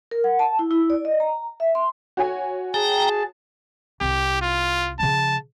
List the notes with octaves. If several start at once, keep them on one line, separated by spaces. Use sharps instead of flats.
A#4
F#5
A5
E4
E4
D5
D#5
A#5
E5
C6
F#4 C#5 G#5
G#4 G5 A5 A#5
C2 E4 G4
F4
C#3 F3 A5